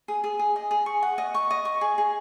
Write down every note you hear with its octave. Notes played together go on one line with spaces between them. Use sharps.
G#4
G#4
G#4
D#5
G#4
C#6
F#5
D#5
C#6
D#5
C#6
G#4
G#4